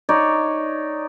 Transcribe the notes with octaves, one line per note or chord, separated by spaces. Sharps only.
D#4 C#5 D5